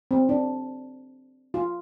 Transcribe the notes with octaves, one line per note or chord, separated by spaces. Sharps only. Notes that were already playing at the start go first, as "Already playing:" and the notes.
C4
D4
F4